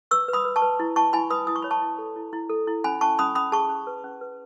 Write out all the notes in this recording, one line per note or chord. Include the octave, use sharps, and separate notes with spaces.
B4 C#6 E6
B4
B5 D#6
B4
A5 C#6
B4
E4
E4 A5 C#6
E4 G#5 B5
B4 B5 D#6
E4 D#6
C#6
C#5 B5
A5 C#6
E4
A4
E4
E4
A4
E4
C#4 G#5 B5
C#4 A5 C#6
C#4 B5 D#6
C#4 B5 D#6
G#4 A5 C#6
C#4
B4
C#4
B4